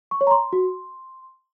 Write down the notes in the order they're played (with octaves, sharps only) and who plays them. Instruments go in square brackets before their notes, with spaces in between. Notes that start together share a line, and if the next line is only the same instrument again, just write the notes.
[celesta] C#6
C#5
A#5
C6
F#4